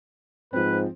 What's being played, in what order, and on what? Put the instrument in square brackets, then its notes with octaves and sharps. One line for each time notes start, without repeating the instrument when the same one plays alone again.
[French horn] G#2 [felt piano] F3 C4 [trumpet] B4